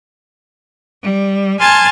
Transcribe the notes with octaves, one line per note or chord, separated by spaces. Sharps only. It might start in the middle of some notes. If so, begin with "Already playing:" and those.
G3
G#5 A5 C6 F6 G#6 A6